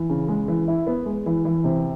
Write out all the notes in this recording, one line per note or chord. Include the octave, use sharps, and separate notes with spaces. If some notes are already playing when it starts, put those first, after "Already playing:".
Already playing: E3
C#3
G#3
E3
E4
B3
G#3
E3
E3
C3